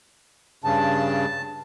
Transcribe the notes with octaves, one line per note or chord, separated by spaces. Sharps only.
G2 C#3 A5